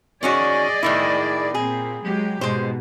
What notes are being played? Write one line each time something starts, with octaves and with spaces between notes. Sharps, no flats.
D#3 C#4 F#4 G#4 D5 D#5
A2 D#3 E4
A#2 C4 G#4
F#3 G#3 G4
G#2 B2 G#3 C5